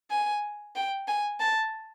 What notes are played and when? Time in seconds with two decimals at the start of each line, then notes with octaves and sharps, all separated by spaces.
0.11 G#5
0.76 G5
1.08 G#5
1.40 A5